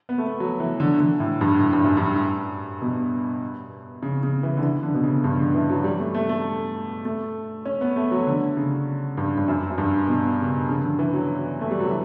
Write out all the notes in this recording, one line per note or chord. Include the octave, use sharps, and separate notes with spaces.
B3
A3
B3
F#3
E3
D3
D3
A2
G2
A2
G2
F#2
G2
B2
C#3
C#3
E3
D3
E3
D3
B2
C#3
G2
D3
E3
F#3
G3
A3
A3
A3
A3
C#4
B3
A3
F#3
D3
C#3
G2
G2
F#2
F#2
G2
B2
C#3
C#3
D3
E3
F#3
A3
G3
F#3
E3